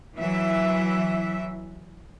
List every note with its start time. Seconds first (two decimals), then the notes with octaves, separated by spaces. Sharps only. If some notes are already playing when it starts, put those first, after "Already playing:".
0.17 E3 F#3 E5